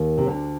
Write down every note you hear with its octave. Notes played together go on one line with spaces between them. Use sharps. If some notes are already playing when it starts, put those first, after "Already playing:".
Already playing: D#2 D#3
C3
D2 D3